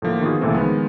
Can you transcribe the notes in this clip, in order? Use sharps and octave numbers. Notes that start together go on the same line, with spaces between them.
A2 D3 F3 A#3
D#3 B3 F4 F#4 G#4
C#2 A#2 E3 A3 C4
D#3 F3 G#3 B3